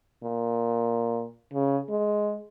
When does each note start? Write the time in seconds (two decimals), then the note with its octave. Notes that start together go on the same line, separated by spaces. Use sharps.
0.24 A#2
1.53 C#3
1.89 G#3